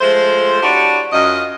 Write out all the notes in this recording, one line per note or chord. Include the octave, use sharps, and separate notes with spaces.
F3 G#3 A3 C5
D4 E4 F#4 G4 C#5 D5
F#2 F#3 F4 D#5